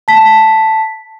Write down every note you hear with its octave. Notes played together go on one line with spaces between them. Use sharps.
A5 B6